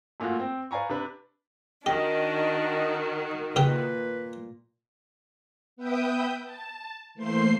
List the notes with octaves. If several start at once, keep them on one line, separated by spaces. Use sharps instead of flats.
F#2 A#2 A3 F4 F#4
C4 G5
B4 D5 F5 G#5 A#5 C#6
C3 D4 B4
D#3 D4 F#4 G4 D#5
A#2 C#3 G4 B4 G5
B3 B4 E5 G5 D#6 G6
A5
E3 A3 A#3 C5 C6 C7